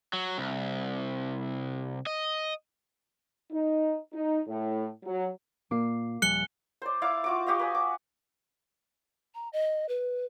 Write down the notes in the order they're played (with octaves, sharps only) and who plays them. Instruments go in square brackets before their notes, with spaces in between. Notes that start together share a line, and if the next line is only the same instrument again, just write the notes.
[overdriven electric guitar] F#3
C2
D#5
[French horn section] D#4
D#4
A2
F#3
[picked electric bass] A#2 [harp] A#3 D6 C7
[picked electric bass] D#1 F3 G3 [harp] G#5 [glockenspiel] F#6 C#7 G7
[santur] C5 D5
E4 D5 F5 D6
F4 F#4 D6
F#4 G4 D#5 F5
B4 G#5
D6
[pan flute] A#5
D#5
B4